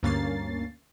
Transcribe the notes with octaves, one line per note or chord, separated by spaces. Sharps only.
D2 G2 A#3 C#4 A6 C7